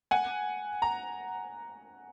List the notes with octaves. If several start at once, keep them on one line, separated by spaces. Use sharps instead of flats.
F#5 G#5
A#5